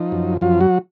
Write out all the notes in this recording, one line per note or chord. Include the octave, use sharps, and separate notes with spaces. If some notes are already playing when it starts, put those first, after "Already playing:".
Already playing: F3 D#4
F#2
F#2 F3 F4
F#3 F#4